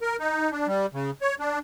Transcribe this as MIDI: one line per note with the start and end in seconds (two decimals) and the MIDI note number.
0.01 0.16 70
0.20 0.50 63
0.52 0.67 62
0.67 0.86 55
0.94 1.10 49
1.22 1.35 73
1.40 1.59 62